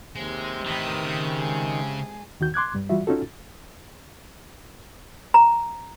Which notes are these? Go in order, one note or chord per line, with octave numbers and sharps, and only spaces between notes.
D#2 C3 G#3
E2 A2 D#3 B4 D#6
C#3
G#3 G#4 A5
D#2 D#3 F#4 G6
C6 D6 F#6 G#6
G2 G3
E3 G3 F4 F#4 E5
C#4 D#4 F4 F#4 A4
A#5